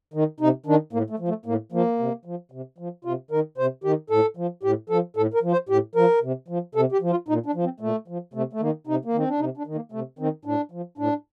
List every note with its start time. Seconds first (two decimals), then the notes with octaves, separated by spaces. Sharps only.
0.14 D#3
0.40 C3 D#4
0.66 D#3 D4
0.93 A2 A#3
1.10 A3
1.19 F3
1.28 A3
1.46 A2 A#3
1.72 F3 A#3
1.99 C3
2.25 F3
2.52 C3
2.78 F3
3.05 C3 F4
3.31 D#3 A#4
3.58 C3 C5
3.84 D#3 G4
4.10 A2 A4
4.37 F3
4.63 A2 G4
4.90 F3 A4
5.16 A2 A4
5.34 A#4
5.42 F3
5.52 C5
5.69 A2 G4
5.95 F3 A#4
6.22 C3
6.48 F3
6.75 C3 A4
6.92 G4
7.01 F3
7.10 F4
7.28 A#2 D#4
7.46 D4
7.55 F3
7.64 C4
7.80 A#2 A3
8.08 F3
8.34 C3 A3
8.53 A3
8.60 D#3 A#3
8.87 C3 D#4
9.05 A#3
9.14 D#3 C4
9.28 D4
9.39 C3 D#4
9.58 D4
9.67 D#3
9.75 A#3
9.92 C3 A3
10.19 D#3 C4
10.45 A2 D4
10.72 F3
10.98 A2 D4